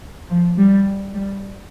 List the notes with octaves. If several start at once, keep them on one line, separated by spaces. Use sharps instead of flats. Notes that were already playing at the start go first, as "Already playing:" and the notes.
F3
G3
G3